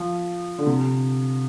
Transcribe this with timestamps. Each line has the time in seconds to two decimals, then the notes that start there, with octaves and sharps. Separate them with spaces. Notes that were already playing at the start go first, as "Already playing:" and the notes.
Already playing: F3
0.58 D3
0.67 C3